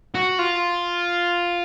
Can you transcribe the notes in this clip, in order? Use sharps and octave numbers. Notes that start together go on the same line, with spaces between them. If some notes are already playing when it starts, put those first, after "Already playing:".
F#4
F4